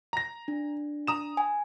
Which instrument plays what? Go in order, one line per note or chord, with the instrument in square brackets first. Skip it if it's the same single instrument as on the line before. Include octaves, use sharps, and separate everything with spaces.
[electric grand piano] A#5 A#6
[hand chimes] D4
[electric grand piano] A#5 D#6 E7
[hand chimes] G#5